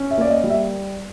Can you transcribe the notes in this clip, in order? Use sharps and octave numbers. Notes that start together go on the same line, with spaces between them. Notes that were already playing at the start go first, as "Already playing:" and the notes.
Already playing: C#4
E5
A#3 D5
D#5
G3
E5